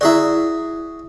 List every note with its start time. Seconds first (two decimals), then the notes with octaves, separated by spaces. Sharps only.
0.01 E4 F#4 G#4 D5 E5